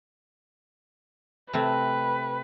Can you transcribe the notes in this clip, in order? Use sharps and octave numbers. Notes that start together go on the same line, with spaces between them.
C3 A3 C4 B4